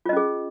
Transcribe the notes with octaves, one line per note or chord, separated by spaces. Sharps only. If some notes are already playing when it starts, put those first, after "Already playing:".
C#4 F4 G#4 D#5